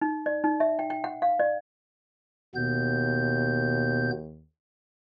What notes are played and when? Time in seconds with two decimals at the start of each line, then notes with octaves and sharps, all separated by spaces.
0.02 D#4
0.26 D5
0.44 D#4
0.60 E5
0.79 G5
0.90 G5
1.04 F#5
1.22 F5
1.39 D5
2.55 D#2 B2 B3 G6